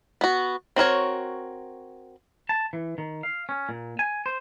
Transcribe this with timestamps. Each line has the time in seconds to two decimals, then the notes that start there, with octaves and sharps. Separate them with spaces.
0.21 B3 F#4
0.76 C4 F#4 A#4 C#5
2.49 A5
2.73 E3
2.98 D#3
3.23 F5
3.49 C#4
3.69 A#2
3.99 G#5
4.26 C5